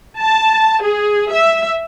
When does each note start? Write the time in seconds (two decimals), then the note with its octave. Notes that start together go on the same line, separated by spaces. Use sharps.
0.20 A5
0.82 G#4
1.31 E5